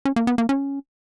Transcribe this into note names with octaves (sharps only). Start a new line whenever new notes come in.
C#4
A#3
B3
A#3
C#4